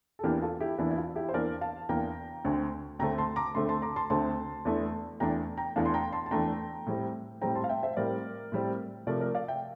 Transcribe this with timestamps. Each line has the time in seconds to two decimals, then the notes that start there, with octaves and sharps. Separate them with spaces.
0.19 A4
0.23 E2 E3 A#3 D4 G4 A#4
0.42 F4 A4
0.60 E4 G4
0.78 E2 E3 A#3 D4 E4
0.90 E4
0.97 F4
1.15 E4 G4
1.29 C5
1.34 E2 E3 A#3 D4 A#4 D5
1.61 F5 A5
1.89 E2 E3 A#3 D4 G5 A#5
2.44 D2 D3 A3 C4
2.99 D2 D3 A3 C4 G5 A#5
3.18 A5 C6
3.36 A#5 D6
3.54 D2 D3 A3 C4 A5 C6
3.69 A5 C6
3.82 A#5 D6
3.96 A5 C6
4.10 D2 D3 A3 C4 A5 C6
4.65 E2 E3 A3 D4
5.20 E2 E3 A3 D4 G5 A#5
5.57 G5 A#5
5.76 E2 E3 A3 D4 F5 A5
5.85 C6
5.94 G5 A#5
6.13 A5 C6
6.26 A5
6.31 E2 E3 A3 D4 G5 A#5
6.86 A2 G3 C4
7.41 A2 G3 C4 G5 A#5
7.55 A5 C6
7.64 F5
7.69 E5 G5
7.83 C5 E5
7.97 A2 G3 C4 A#4 D5
8.52 A2 G3 C4
9.07 C3 F3 A3 A#4 D5
9.21 A#4 D5
9.35 D5 F5
9.48 E5 G5